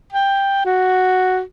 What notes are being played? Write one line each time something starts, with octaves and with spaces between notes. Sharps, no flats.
G5
F#4